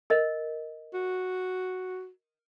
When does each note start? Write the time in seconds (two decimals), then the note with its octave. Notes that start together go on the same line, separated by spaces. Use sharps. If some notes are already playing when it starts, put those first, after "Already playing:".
0.10 A#4 D#5
0.94 F#4